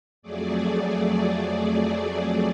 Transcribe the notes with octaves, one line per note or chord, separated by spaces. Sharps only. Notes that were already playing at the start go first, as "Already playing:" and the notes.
F2 F#3 A3 G#4 D5